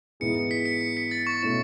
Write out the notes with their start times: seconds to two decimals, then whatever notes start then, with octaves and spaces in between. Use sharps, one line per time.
0.20 G#2 E3 B3 E4 G#4 C#7
0.35 C#7
0.51 B6
0.65 C#7
0.81 C#7
0.97 B6
1.11 A6
1.27 C#6
1.42 B2 A3 C#4 E4 C#6